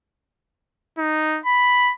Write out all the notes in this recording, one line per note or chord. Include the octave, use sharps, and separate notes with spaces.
D#4
B5